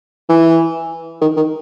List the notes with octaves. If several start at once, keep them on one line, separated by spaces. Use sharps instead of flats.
E3
D#3
D#3